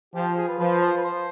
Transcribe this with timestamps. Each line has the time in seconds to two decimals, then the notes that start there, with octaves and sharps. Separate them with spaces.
0.14 F3 G4
0.37 G#4
0.48 B4
0.59 F3 B4
0.82 C5
0.97 B4
1.04 C5